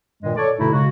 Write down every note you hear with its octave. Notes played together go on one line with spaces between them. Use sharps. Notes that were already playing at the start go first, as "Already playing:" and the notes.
G2 A#2 D#3 G#3
A4 C#5 D5
G2 B2 D3 A3 D#4 E4
C#3 G#3 F#4